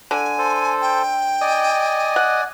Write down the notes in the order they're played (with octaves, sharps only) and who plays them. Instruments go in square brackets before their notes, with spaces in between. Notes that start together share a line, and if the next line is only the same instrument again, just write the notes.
[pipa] D3 [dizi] G#5
[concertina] A4 C5
[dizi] G5
[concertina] D5 G#5 [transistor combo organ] D#5
[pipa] F#5